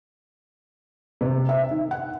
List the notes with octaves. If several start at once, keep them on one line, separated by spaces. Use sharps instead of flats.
C3
E5
D#3
F#5